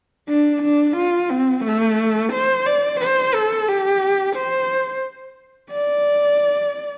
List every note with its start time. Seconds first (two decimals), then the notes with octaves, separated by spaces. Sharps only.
0.29 D4
0.63 D4
0.97 F4
1.30 C4
1.65 A3
2.33 C5
2.66 D5
3.01 C5
3.34 A4
3.68 G4
4.36 C5
5.72 D5